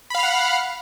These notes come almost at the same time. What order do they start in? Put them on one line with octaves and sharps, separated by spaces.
B5 F5 F6 F#5